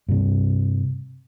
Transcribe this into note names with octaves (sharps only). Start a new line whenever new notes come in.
G2 C3